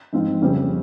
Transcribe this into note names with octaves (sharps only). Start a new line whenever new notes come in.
G#2 F3 C4 F4
F2 C#3 G3 C4 G4